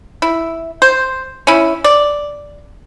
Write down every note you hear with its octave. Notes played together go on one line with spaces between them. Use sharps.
E4
C5
C#4 E4
D5